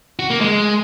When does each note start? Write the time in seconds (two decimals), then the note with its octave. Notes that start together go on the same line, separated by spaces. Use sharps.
0.19 F#4
0.30 A#3
0.41 G#3